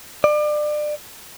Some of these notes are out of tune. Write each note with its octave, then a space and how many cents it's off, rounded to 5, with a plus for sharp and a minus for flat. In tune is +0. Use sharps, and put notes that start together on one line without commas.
D5 +30